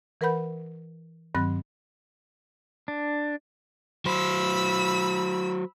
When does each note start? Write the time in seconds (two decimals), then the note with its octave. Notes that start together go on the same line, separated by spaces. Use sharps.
0.21 E3 A#4 B4 F#5 B5 G6
1.35 G2 D#3 F#3 C4 B5 F#6
2.88 D4
4.05 F#3 C5 B5 E6